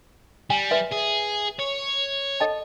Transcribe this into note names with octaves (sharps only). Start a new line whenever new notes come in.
G3 G#5
B4 E5
G#4
C#5
A4 D#5 A5